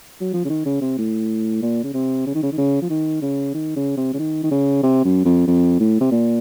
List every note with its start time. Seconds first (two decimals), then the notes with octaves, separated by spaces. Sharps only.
0.21 F#3
0.33 F3
0.45 C#3
0.50 D#3
0.66 C#3
0.81 C3
0.98 A2
1.62 A#2
1.84 C#3
1.94 C3
2.27 C#3
2.35 D#3
2.43 C#3
2.52 D#3
2.58 C#3
2.82 F3
2.90 D#3
3.22 C#3
3.54 D#3
3.76 C#3
3.97 C3
4.14 C#3
4.19 D#3
4.43 D#3
4.51 C#3
4.83 C3
5.05 F#2
5.25 F2
5.47 F2
5.80 A2
6.01 C3
6.11 A#2